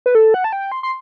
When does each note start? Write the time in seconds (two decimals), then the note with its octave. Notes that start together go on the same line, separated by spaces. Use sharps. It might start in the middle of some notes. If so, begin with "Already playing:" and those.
0.06 B4
0.15 A4
0.34 F#5
0.44 A5
0.53 G5
0.72 C6
0.83 C6